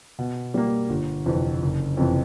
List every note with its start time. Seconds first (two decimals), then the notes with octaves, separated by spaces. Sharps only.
0.19 B2
0.54 G3 A#3
0.89 G1
1.26 F2 C3 E3
1.62 F#1
1.97 F2 C3 E3